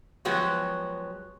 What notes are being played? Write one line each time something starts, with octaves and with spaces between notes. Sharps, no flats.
F3 F#3 G#3 B3 F#4 G4